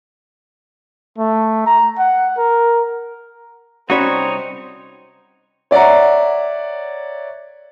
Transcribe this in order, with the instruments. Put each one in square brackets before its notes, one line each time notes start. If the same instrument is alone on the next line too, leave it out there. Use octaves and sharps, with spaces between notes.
[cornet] A3
A#5
F#5
A#4
[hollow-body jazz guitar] C2 C#4 B5 [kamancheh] C4 [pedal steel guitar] D#4 C#5 [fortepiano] F#4 D5
[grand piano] C#5 D5 E5 F#5 A#5